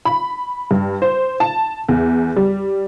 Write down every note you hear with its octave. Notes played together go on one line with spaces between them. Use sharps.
B5
G2
C5
A5
E2
G3